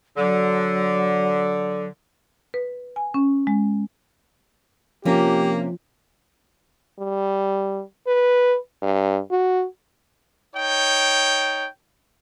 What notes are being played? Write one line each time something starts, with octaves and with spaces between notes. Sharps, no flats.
D3 F#3
B4
G#5
C#4
G#3
C3 F3 A#3 C#4 G4
G3
B4
G2
F#4
D#4 C#5 G5